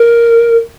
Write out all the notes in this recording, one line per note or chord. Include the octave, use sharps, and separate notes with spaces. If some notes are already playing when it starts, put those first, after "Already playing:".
Already playing: A#4